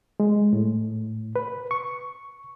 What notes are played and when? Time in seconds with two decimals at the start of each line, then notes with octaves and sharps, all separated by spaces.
0.20 G#3
0.53 A2
1.36 B4
1.71 C#6